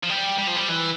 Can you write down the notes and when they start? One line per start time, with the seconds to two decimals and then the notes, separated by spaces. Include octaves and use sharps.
0.03 F3
0.09 G3
0.38 G3
0.48 F3
0.57 G3
0.69 E3